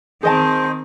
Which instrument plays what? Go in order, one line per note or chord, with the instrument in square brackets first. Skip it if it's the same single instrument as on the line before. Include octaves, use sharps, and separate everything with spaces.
[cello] D#3 C4 [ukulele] G#4 D#5 A5 [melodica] C5